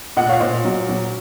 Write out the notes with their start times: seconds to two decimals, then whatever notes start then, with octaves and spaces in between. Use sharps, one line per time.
0.17 A#2 D#5 F#5
0.29 C#5 F5
0.40 A#2 C5 D#5
0.65 F#3
0.89 F#3